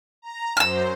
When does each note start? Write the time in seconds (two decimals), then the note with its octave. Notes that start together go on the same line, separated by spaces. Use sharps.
0.22 A#5
0.57 F#2 C5 E6 F6